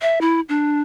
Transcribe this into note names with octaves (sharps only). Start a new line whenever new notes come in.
E5
E4
D4